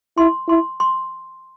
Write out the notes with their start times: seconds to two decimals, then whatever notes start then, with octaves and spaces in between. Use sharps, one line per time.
0.17 E4 C6
0.49 E4 C6
0.80 C6